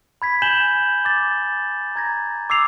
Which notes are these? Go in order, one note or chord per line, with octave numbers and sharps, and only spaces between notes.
B5 G#6 B6
G#5 G6 E7 F#7 G7
D6 A6
A#5 G#6 A#6
D6 E6 C7 F7